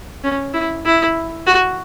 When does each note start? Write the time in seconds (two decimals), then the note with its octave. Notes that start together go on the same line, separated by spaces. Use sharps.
0.24 C#4
0.54 E4
0.86 E4
1.47 F#4